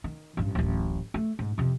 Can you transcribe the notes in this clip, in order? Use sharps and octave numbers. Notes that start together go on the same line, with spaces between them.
D#3
A1 G2
D1 A1
A3
G#2
F2 C3